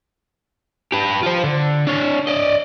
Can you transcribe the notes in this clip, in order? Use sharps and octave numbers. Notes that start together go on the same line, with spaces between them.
G4 B4
F4 C5
D3
D4 C#5
D5 D#5